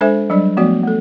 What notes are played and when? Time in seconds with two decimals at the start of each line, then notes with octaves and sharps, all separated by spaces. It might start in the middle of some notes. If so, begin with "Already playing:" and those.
0.01 G#3 D4 A4 C5 E5 G#5
0.30 F#3 G3 D4 D5
0.57 F3 A3 B3 F#4 D5
0.83 A3 A4